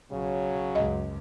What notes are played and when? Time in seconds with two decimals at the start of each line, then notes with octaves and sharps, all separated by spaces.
0.12 B1 C#3 F#3
0.75 C#2 F#2 D#5